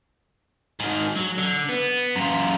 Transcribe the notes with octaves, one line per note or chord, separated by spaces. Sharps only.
G#2 D#3
F#3
D3
B3
F#2 F4